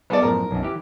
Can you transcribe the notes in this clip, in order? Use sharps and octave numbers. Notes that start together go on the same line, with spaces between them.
G3 B3 G#4 A4 D5
F#2 A2 F3 A#4
B1 F#2
E3 G4